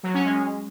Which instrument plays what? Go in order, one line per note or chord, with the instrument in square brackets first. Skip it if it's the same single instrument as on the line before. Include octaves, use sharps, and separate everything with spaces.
[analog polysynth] F#3
C#4
G#3